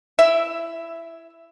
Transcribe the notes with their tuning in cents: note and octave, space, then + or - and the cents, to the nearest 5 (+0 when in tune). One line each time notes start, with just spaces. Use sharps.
E4 +15 E5 +0